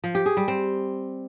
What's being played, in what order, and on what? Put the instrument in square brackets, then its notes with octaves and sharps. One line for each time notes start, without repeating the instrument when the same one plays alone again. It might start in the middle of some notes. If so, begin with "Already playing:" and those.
[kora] F3
G4
G#4
G3
C4